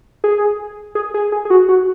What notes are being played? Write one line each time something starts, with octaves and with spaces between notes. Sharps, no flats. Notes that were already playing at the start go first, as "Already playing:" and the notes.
G#4
G#4
G#4
G#4
G#4
F#4
F#4